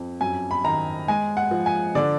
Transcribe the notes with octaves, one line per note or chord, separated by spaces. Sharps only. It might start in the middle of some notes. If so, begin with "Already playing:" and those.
Already playing: F2
F#2 G#5
B5
D#3 A#5
G#3 G#5
F#5
F3
G#5
D3 D5